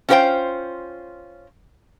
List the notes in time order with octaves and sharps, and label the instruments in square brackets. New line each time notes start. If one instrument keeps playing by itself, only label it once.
[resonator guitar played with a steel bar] C#4 F4 F#4 B4 C5 G5